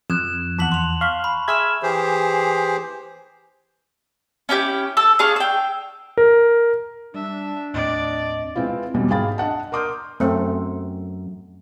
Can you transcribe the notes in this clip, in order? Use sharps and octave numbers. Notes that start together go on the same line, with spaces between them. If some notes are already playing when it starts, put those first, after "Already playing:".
F2 F#6 G#6 E7
E2 F#5 A5 B6 F#7
C6 F7
F5 C#6 B6
B5
G#4 E5 C6 F6 G#6 E7
E3 G4 G#4 C5
C#4 E4 G4 G5
A4 E6
D4 G#4 F5 C#6
G5 E6
A#4
G3 D4 E5
D#2 A2 C4 D5 D#5
G#3 B3 C4 E4 F4
B1 E2 G3
G#1 G#4 F5 G5 B5 A6
D4 D#5 F#5 A5
A#4 C6 D6 D#6 F6 G6
F#2 A3 C4